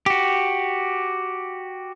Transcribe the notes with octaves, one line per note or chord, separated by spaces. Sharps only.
F#4 G4